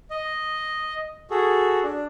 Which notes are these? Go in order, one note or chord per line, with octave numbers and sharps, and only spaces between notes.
D#5
F#4 G#4 A4
D4